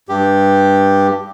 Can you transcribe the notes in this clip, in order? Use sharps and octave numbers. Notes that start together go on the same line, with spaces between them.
G2 G4